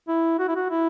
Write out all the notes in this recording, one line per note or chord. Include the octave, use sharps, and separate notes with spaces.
E4
F#4
E4
F#4
E4